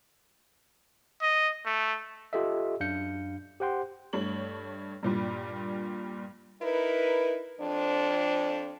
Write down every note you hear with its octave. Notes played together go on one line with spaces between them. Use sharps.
D#5
A3
F4 G4 A4 D#5 E5
F#2 D4 F5 G6 C#7
G4 C5 F#5 G5 C6
G2 A3 C#5 F#7
G2 A#2 G3
D#4 E4 A#4 B4
F2 D4 C5